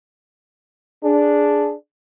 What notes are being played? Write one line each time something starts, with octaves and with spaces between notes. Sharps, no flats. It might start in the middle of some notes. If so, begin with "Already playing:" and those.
D4 G#4